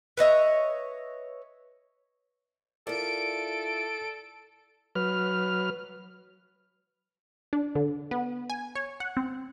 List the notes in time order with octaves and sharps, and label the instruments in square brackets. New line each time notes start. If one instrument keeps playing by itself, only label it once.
[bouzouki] B4 C#5 D#5 E5
[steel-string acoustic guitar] E4 F4 [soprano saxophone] A4 [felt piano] A#4 D5 [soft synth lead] D7
[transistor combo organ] F#3 B4 F6
[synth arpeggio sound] D4
D3
B3
G#5
C#5
F#5
C4